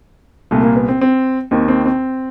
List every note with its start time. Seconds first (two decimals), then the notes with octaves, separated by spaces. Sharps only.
0.51 C2 A#2 A3
0.63 A#3
0.76 B3
0.88 C4
1.01 C4
1.51 D#2 D#3 C4
1.68 C4
1.86 C4